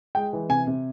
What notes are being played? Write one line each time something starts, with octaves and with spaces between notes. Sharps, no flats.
G#3 G5
E3
C3 G#5
C3